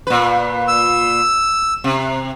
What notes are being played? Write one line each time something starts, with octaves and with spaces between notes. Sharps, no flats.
A#2 B4
E6
C3